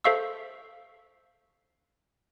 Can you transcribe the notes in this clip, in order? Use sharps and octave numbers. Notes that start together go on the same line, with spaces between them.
A4 C5 E5 F5 C#6 E6